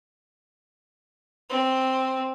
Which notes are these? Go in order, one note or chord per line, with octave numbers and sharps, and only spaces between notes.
C4